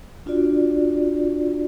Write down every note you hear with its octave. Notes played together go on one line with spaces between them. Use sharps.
D4 F4 F#4 D5